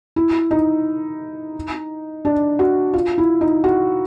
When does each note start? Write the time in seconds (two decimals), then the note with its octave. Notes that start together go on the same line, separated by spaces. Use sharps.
0.16 E4
0.51 D#4
2.25 D4
2.59 F#4
2.94 F4
3.18 E4
3.41 D#4
3.64 F#4